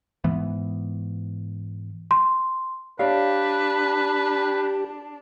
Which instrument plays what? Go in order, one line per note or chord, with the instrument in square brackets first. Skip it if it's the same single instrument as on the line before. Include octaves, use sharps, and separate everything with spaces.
[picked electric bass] G#2 E3 B3
[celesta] C6
[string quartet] D4 [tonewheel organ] G4 [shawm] B4 [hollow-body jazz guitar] C#5 D5 F5